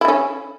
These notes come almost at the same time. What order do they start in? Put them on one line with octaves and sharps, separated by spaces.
E4 D3 C#4